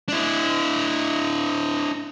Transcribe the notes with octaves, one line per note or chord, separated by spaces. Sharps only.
D4 E4